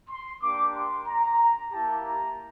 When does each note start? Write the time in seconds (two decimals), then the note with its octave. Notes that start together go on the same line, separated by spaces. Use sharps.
0.09 C6
0.42 A#3 D4 G4 D6
0.74 C6
1.07 A#5
1.73 A#3 E4 G4 A5
2.06 A#5